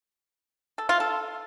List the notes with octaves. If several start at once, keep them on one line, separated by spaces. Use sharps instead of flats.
A4
F4
A4